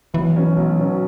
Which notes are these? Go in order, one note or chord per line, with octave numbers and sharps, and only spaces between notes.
B1 E3
B2 F#3 C#4
B1
B2 F#3 C#4